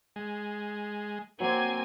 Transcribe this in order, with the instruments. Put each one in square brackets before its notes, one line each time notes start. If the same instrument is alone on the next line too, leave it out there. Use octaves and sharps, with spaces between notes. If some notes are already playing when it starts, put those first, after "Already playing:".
[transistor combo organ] G#3
[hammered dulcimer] F#3 D6 [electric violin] A#3 G#5 [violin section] C4 G#6